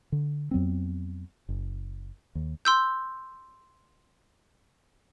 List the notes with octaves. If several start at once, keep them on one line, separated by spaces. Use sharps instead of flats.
D3
F2 F#3 B3 C4
F#1
D#2
C6 E6 G6